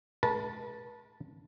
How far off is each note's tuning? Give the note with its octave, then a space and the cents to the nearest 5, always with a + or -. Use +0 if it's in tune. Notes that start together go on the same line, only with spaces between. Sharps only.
G#3 +35 B4 -40 A5 +0